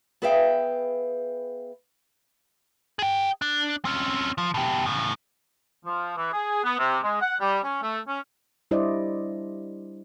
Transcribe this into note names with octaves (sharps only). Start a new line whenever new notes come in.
B3 G#4 B4 E5 F5 G5
G#4 G5
D4
C4 C#4
F3
B2 G4
A2 C#3
F3
E3
G#4
B3
C3
G#3
F#5
G3
C#4
A3
C#4
G3 D4 E4 C5 D5 D#5